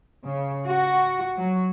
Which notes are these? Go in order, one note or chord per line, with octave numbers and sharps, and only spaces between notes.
C#3
F#4
F#3